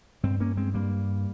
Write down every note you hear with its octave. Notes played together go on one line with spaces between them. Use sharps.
G2 G#3 C4
A#3 C#4
G#3 C4
G2 G3 A#3